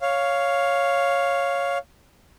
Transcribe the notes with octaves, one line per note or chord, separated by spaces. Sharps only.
C#5 F5